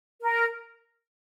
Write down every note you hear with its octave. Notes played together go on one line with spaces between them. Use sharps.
A#4